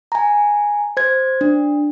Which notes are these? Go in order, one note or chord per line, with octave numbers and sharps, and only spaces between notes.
G#5 A#5
C5 G#6
D4